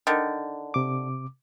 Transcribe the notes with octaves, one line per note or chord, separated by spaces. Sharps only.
D3 D#3
C3 D6